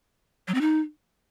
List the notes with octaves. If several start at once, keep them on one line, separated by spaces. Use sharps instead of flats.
F#3
C4
D#4